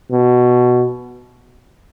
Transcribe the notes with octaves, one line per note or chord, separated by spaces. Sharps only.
B2